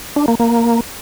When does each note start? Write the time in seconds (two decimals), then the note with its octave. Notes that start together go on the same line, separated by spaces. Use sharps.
0.16 D4
0.28 A#3
0.40 A#3